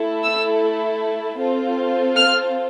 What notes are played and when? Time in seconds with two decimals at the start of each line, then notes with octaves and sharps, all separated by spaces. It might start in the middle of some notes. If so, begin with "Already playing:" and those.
Already playing: A3 E4 A4
0.24 E6
1.39 C4 F4 A4
2.16 F6